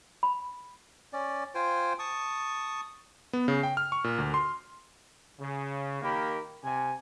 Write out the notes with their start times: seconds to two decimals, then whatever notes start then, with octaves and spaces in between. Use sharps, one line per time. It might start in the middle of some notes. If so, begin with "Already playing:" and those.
0.23 B5
1.13 C#4 D5
1.55 F4 C5 G5 G#5
1.99 A5 C#6 D#6
3.33 B3
3.48 C#3
3.63 G5
3.77 F6
3.92 C#6
4.04 A#2
4.18 D2
4.34 C6
5.39 C#3
6.02 D#3 A#3 G4 A#4 B5
6.64 C3 G#5